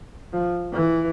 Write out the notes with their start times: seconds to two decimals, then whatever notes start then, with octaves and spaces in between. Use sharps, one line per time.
0.33 F3
0.73 E3